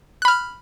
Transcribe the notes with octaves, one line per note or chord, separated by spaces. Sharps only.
B5 F6 F#6